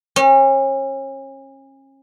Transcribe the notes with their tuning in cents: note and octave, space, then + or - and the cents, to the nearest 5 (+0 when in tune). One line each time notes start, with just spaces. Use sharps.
C#4 -35